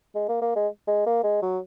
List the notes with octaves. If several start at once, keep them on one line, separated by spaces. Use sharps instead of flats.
G#3
A#3
A#3
G#3
G#3
A#3
G#3
F#3